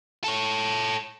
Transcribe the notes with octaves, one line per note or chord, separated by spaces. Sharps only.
A4 C#5